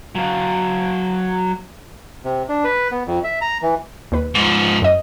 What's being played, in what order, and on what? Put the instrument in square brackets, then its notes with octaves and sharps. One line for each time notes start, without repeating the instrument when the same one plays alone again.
[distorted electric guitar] F#3 F5
[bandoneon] C3
D4
B4
B3
F2
E5
A#5
E3
[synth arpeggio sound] D#2 B4
[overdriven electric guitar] G#2 F3
[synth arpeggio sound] F#2 D#5